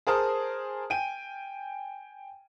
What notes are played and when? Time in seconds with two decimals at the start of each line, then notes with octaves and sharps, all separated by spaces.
0.07 G#4 A#4 C5 A5 D#6 F6
0.90 G5 G#5 D#7